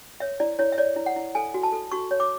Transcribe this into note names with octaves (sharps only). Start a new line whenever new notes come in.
C#5 E5
E4 D5
E4 C#5
E5
C#5 D5
E4
F#5
E4
A4 G#5
F#4
A5
A4
F#4 C#6
C#5
D6